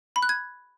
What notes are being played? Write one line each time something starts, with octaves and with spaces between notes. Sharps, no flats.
B5
F#6
G#6